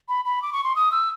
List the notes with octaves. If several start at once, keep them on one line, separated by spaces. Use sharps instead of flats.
B5
B5
D6
C#6
C6
D#6
E6